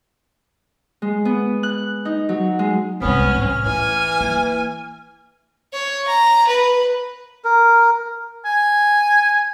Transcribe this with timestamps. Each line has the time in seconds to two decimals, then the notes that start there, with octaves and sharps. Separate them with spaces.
1.02 G#3
1.25 B3
1.63 F#6
2.05 D#4
2.29 F#3
2.59 G#3
3.02 C2 G#3 B3 C#4 F6
3.36 A2
3.66 E3 A3 G#5
4.21 A#3
5.73 C#5
6.08 A#5
6.47 B4
7.45 A#4
8.45 G#5